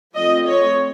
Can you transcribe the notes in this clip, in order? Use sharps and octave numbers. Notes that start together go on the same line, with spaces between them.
F3 A3 C4 D#5
C#5